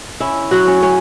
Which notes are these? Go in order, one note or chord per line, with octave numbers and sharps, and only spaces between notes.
C#4 E4
F#3 F#4
C#4
C#4 C#5